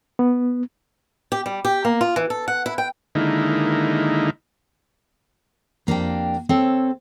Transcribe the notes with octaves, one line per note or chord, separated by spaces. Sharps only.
B3
G4
G3
G4
A#3
F4
E3
A4
F#5
E4
G5
D3 D#3 G#3 A#3 D#4 E4
F2 A#3 D4 G4 G5
C4 A4 C#5